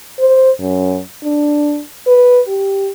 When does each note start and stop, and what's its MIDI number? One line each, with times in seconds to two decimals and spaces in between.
0.19 0.51 72
0.60 1.00 42
1.23 1.80 62
2.07 2.40 71
2.47 2.90 67